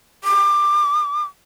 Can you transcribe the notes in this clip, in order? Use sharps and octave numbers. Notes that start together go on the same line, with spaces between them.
D6